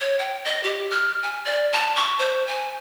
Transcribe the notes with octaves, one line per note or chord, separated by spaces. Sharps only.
C#5
G5
D#5
G4
F6
G#5
D5
A5
C#6
C5
G#5